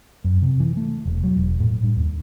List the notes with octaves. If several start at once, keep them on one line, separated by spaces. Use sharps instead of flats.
F#2
C3
E3
A3
E1
F#3
E1
A2
G2
D#2